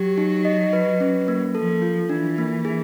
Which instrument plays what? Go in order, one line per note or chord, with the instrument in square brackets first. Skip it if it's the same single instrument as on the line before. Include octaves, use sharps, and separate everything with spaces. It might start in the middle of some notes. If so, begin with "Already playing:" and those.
Already playing: [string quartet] F#3 [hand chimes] G4
[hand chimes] D#4
D#5
B4
C#4
A#3
[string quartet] F3 [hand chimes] A4
[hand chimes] F4
[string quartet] E3 [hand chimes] D4
[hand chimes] A#3
G#4